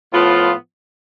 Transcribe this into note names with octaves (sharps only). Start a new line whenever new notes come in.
A2 F3 B3 F4